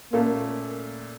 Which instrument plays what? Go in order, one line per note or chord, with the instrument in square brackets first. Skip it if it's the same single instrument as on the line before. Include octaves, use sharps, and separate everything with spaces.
[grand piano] A#2 A3 C#4 A4 [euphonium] A#3